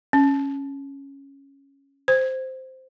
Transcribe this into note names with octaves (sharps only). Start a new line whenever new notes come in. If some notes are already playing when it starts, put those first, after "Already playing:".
C#4
C5